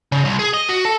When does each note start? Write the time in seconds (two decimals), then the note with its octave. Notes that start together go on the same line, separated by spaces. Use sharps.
0.12 C#3
0.25 C2
0.39 G#4
0.54 D#5
0.69 F#4
0.85 A4